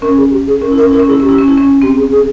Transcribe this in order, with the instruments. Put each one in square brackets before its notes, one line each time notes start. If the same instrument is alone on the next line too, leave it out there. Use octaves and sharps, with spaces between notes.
[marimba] C#4 [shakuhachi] A#4
[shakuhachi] G#4
G4
G#4
[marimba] C#4 [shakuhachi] A#4
[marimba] E4
[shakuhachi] A#4
[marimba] C#4
[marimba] E4 [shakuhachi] A#4
[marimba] C#4
[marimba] E4 [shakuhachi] G#4
[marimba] C#4 [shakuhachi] G4
[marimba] E4
C#4
E4
C#4
[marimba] C4 [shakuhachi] G4
[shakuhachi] G#4
G#4